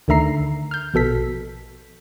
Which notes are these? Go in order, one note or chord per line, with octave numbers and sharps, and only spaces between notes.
D2 D3 D#3 E5 A#5 C7
F6 G6
A#1 B2 A4 B6